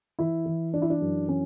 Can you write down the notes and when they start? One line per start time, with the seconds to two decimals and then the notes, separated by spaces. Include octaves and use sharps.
0.19 E3 E4
0.46 E3
0.74 E3 D4
0.82 E4
0.90 D4
1.01 F#2
1.28 E3 C#4